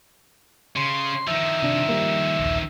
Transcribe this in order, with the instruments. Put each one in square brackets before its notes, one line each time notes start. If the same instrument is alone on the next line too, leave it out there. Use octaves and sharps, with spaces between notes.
[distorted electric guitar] C#3 [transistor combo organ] C6
[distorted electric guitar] D#3 F3 [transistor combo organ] E5
[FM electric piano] C3 D4
G3 A#3
A#1 D#2